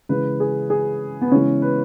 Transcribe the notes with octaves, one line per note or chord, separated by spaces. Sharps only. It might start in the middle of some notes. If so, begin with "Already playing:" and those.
C#3 E3 G#3 B4
G#4
G#4
B3
C#3 E3 G#3 C#4
B4